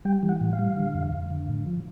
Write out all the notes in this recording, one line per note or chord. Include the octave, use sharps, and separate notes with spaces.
G3 G5
E3
F#5
A2
F5
G3
D3
F2
F2
D3
A2
F3